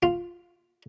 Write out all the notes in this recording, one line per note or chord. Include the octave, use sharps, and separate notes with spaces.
F4